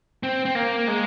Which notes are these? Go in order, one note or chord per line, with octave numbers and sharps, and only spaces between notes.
C4
C4
A#3
G#3